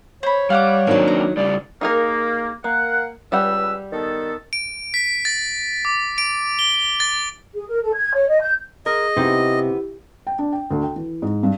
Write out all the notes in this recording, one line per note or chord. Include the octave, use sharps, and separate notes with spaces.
C5 C#5 B5
G3 F5 F#5 D6
D#3 F3 F#3 A#3 C4 D4
A#5
C#3 G3 D5
A#3 D#4 G#4 A#4
A#3 A#4 F5 F#5
C#2 G3 G4 B4 F#5 E6
D#3 B3 A4
D7
B6
A6
D6
D7
G7
A6
G#4
A#4
A4
G#6
C#5
D#5
G6
G#4 A#4 D#5
C3 B3 D#4 E4 G4 C5
G5
D4
G5
D2
G5
E3
G#2
G2